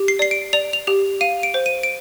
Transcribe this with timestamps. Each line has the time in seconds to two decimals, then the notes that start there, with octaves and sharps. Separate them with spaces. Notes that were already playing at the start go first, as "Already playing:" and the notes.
Already playing: G4
0.08 C7
0.19 D5 C7
0.31 D7
0.53 D5 F7
0.73 F7
0.87 G4 F7
1.21 F5 D#7
1.43 D7
1.54 C5
1.66 D#7
1.83 D7